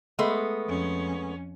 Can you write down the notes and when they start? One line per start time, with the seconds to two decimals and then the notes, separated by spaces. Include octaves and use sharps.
0.19 G#3 A3 B3
0.66 F2 C#4